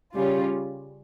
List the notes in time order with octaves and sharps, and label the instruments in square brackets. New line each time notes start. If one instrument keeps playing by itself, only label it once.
[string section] C#3 G3 C#4 F4